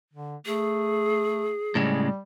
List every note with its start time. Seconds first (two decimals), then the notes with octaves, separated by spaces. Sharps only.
0.13 D3
0.46 A3 G#4
1.75 A2 C#3 G3 G#3